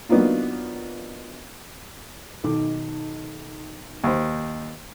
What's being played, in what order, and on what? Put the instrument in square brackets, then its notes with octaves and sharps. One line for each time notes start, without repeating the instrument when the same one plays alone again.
[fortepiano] F#3 A#3 B3 D4 D#4 F4
[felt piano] B1 D#3 D6
[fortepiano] D#2 C5